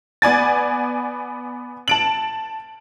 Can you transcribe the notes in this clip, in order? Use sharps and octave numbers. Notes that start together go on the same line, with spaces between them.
B3 D5 G#5 A6
A5 D7 F#7